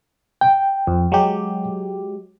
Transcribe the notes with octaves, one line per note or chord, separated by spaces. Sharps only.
G5
F2
F#3 G#3 G4